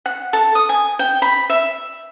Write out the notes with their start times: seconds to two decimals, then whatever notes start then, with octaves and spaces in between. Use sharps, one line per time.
0.06 F#5
0.33 A4
0.55 D#6
0.69 G#5
0.99 G5
1.22 B5
1.50 E5